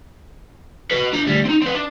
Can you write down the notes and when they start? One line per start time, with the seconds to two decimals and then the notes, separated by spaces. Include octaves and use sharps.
0.91 F#4 B4
1.13 D4 A#5
1.26 D2 G3
1.45 C4 D#4
1.62 C4 B4
1.75 D4